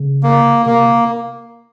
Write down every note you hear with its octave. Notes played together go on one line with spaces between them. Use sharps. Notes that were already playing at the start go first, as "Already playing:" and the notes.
Already playing: C#3
A#3
C3 A#3